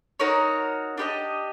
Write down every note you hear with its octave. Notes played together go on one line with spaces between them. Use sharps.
D#4 F#4 A#4 C#5
D4 G4 A#4 D#5